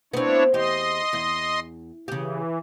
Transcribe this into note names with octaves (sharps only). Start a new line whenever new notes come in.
B3 C4 D4 E4 C#5
E2 G4 D#5 C6
E2
C#3 E3 G4